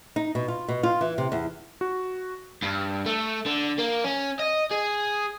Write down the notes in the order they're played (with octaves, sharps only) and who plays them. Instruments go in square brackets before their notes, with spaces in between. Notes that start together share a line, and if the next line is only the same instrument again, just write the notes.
[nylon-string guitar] D#4
B2
F4
B2
F4
E3
C3
E2
[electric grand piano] F#4
[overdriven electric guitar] G2
A3
D3
A#3
C#4
D#5
G#4